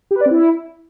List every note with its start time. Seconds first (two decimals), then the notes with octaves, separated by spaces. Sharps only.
0.11 G4
0.16 B4
0.21 D5
0.26 C4
0.31 E4